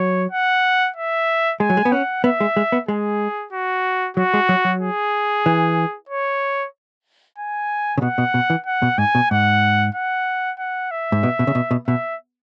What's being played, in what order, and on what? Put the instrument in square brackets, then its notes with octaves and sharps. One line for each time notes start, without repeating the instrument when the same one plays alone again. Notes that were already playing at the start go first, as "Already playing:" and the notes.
Already playing: [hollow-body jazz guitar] F#3 [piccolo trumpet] C#5
[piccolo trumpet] F#5
E5
[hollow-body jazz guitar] G#3 [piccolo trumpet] G#5
[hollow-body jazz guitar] F#3
G#3
B3
[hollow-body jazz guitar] C#4 [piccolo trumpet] F#5
[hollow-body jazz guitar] B3 [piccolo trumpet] E5
[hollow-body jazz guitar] G#3
G#3
B3
[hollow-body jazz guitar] G#3 [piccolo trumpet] G#4
[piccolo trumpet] F#4
[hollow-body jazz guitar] F#3 [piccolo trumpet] F#4
[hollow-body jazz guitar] G#3
F#3
F#3
[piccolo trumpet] G#4
[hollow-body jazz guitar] E3
[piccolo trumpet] C#5
G#5
[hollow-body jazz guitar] C#3
[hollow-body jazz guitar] B2 [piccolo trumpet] F#5
[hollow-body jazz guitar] B2
B2
E3
[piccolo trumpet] F#5
[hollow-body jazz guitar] B2
[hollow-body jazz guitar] G#2 [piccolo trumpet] G#5
[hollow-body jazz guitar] B2
[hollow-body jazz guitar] G#2 [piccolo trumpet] F#5
[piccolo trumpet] F#5
F#5
E5
[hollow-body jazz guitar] G#2
B2
B2
C#3
B2
B2
[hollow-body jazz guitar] B2 [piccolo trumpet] E5